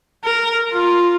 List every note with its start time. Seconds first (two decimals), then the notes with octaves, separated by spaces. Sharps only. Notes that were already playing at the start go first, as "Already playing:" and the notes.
0.24 A#4
0.72 F4